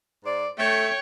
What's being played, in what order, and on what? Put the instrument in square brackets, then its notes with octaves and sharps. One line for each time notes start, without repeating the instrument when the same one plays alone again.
[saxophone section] G#2 C5 D5
[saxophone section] A3 [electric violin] C#5 G5